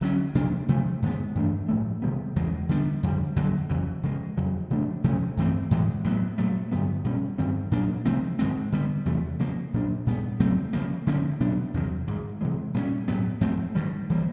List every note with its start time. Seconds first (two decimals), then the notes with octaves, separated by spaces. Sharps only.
0.01 D3 F#3 A3 C#4
0.35 C3 F3 A#3 D4
0.68 C3 F3 A3
1.02 G#2 D#3 G#3 B3
1.35 G2 E3 A3 D4
1.69 A2 F3 A3
2.02 C3 D#3 G3 B3
2.36 E2 C#3 E3 G#3
2.69 D3 G3 B3 D4
3.03 F2 D3 G3
3.36 F#2 D3 F#3 A#3
3.70 F2 C#3 E3
4.03 C#3 F3 G#3
4.37 F2 C#3 F#3
4.70 C#3 F3 A3 D4
5.04 C3 F3 A3 C#4
5.37 G2 E3 A3 C4
5.71 A2 E3 G#3
6.04 A2 F#3 B3
6.38 A#2 F#3 A3
6.72 G2 D3 F#3 B3
7.04 B2 G3 A#3 C#4
7.38 G2 D#3 G3 C4
7.71 A#2 F#3 A#3 D4
8.05 C3 F3 A3 C4
8.39 G#2 D#3 G#3 C4
8.72 D3 G3 B3
9.05 E2 C3 E3 A3
9.39 C#3 F3 A#3
9.73 A#2 F#3 A#3 D4
10.06 A#2 G3 B3
10.40 C#3 F#3 A3 C4
10.73 C#3 F3 A#3
11.07 D3 F3 A#3 C#4
11.40 B2 F#3 B3 D4
11.74 E2 C3 D#3 F#3
12.07 G#2 D#3 G#3
12.41 C3 E3 G#3
12.74 A#2 G3 A#3 C#4
13.08 A2 F#3 B3
13.41 G#2 F3 A3 C4
13.75 G2 D#3 G3
14.10 E3 G3 A#3